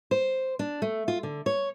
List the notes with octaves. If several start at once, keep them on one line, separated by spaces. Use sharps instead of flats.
C5
D4
A3
F4
D3
C#5